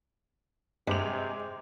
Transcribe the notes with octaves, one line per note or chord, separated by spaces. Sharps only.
G2 C3 G#3 D6 F7